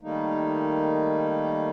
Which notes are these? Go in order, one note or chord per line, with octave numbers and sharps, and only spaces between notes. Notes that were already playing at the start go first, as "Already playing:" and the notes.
D#3 G3 A3 A#3 D#4